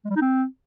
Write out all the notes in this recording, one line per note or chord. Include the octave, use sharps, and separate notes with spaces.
G#3
G3
D#4
C4